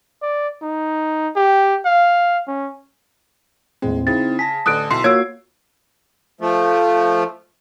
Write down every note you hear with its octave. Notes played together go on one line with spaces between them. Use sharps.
D5
D#4
G4
F5
C#4
D#2 A2 G#3 C4
C#3 C4 D#4 E4 A6
G#5 A5 A#6 B6
A1 D3 D#6 F#6 D7
B1 E4 C6 C7
A#3 F4 F#4 C#5 E6 G#6 D7
F3 A3